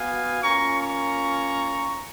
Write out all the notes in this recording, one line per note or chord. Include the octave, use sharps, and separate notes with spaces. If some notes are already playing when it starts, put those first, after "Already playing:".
Already playing: B3 F#4 F5 G#5
A#3 C#4 F4 A#5 C#6
A#5 C#6